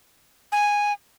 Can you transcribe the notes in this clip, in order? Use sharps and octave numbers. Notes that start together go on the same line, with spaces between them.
G#5